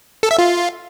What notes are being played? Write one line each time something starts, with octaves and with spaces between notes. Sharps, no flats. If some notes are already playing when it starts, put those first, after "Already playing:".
A4
E5
F4